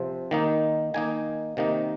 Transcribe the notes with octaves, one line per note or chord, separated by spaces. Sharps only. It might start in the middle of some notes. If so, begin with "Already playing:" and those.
Already playing: C3 F3 C4
D#3 A#3 D#4
D#3 A#3 D#4 G#5
C3 D#3 A#3 D#4